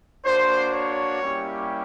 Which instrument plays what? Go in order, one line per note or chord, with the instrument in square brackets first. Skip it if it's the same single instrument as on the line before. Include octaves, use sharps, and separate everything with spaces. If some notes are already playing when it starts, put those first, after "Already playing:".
[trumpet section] A#3 D4 F#4 C5
C#5
G3 A#3 C#4 E4 G4